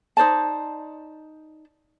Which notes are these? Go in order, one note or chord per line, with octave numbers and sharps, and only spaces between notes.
D#4 C5 D5 A5